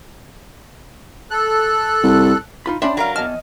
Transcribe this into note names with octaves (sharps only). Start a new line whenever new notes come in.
A4 F#6
C2
D#4 F4 B5
C#4 D4 D5 E5 G5 B5 C6
F#3 A#4 F5 A#5
E2 D#5 A5 F6